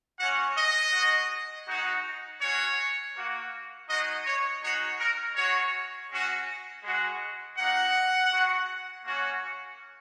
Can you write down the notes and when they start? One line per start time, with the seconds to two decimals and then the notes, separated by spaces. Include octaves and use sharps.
0.18 A#3 C#4 F#4 F#5
0.56 D#5
0.92 G#3 F#4
1.67 G#3 D#4 F#4
2.40 G#3 C#4 F#4 C#5
3.14 A#3 F#4
3.88 G#3 D#4 F#4 D#5
4.25 C#5
4.62 G#3 D#4 F#4 C#5
4.99 A#4
5.35 G#3 F#4 C#5
6.09 G#3 C#4 F#4
6.84 G#3 F#4
7.57 A#3 D#4 F#4 F#5
8.32 G#3 F#4
9.04 A#3 C#4 F#4